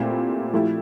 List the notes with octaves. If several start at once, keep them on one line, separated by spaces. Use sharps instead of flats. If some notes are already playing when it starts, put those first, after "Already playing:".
Already playing: A#2 A3 C4 E4 G4
F3 A3 E4 G4